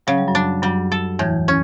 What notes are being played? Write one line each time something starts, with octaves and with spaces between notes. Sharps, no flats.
C#3 F#3
G3
F#2 F#3
D4
F#2 F#3 G3
A4
E2 A2 E3
C#4